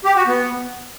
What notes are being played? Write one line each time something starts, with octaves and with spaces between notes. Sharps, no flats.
G4
F#4
B3